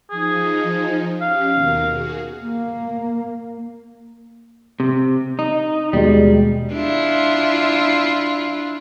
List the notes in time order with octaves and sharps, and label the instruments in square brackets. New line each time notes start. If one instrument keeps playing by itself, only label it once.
[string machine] F3 D#4 [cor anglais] G#4
[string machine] C#4 G4 [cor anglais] F5
[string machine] D#2 B2 A#4
F#4 G#4
[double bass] A#3
[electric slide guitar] C3
D#4
[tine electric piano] D#2 B2 G#3 [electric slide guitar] G3
[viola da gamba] D4 E4 F4